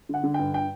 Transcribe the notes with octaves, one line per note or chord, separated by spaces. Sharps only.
D3 F#5
D3
G2 G5
G5